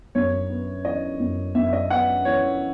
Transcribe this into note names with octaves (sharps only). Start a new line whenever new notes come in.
F#2 C#5
B3
E3 D#5
F#2
F#2 E5
E5
D#5
B3 F#5
E3 C#5